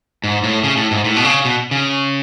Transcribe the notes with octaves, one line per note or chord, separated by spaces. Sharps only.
G#2
A2
C#3
A2
G#2
A2
B2
C#3
B2
C#3